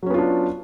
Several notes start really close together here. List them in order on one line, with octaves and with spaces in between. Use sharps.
F#3 C#4 B3 F4 D4